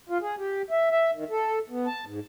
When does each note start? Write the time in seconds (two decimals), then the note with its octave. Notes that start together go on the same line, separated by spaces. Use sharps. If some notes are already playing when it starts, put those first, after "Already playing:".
0.09 F4
0.21 G#4
0.38 G4
0.71 E5
0.91 E5
1.13 D#3
1.30 A4
1.70 B3
1.87 A5
2.06 G#2